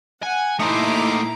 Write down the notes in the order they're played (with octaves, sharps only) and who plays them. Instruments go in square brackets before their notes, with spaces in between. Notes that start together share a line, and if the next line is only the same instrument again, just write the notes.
[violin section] F#5 [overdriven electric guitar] G#5
[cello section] A#2 E4 [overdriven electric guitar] A3 C5 [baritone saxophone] D#4 [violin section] A#5 D6